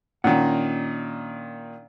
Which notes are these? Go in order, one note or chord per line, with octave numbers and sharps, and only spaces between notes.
A#2 D#3 C#4 D4 F#5